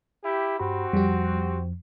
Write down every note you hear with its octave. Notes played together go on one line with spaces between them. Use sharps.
E4 G4
G2 C4 F#4 G4 B5
F2 F3 G3 G4